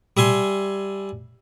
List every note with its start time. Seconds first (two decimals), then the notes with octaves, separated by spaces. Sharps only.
0.17 G3 E5 G#5 C6